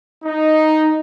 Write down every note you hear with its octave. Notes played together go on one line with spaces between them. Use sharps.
D#4